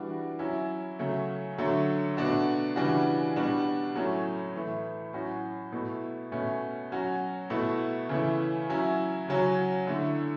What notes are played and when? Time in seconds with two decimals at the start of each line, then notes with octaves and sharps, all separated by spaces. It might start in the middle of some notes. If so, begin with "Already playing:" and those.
Already playing: E3 G3 D4 F#4
0.39 F#3 C#4 E4
0.99 C#3 F#3 A3
1.58 D3 F#3 A3
2.17 B2 A3 D4 F#4
2.76 C#3 E3 G3 D4 F#4
3.36 B2 G3 D4 F#4
3.95 A2 F#3 A3 C#4
4.54 A2 E3 A3
5.13 A2 F#3 C#4 F#4
5.72 B2 A3 E4
6.32 B2 A3 C#4
6.92 F#3 C#4 F#4
7.50 B2 A3 E4
8.09 C#3 E3 A3 E4
8.69 F#3 C#4 E4
9.28 C#3 F#3 C#4 F#4
9.87 D3 A3 E4